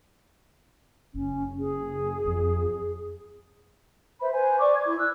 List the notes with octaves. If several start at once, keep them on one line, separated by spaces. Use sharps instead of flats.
F#1 C#4
G#4
F2
B4 C5 E5 B5
B4 C5 G#5
D5 C#6 D6
G#6
E4
E6 F#6